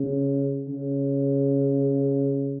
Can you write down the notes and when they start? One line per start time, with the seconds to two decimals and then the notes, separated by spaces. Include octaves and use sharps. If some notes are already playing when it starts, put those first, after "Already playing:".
Already playing: C#3
0.68 C#3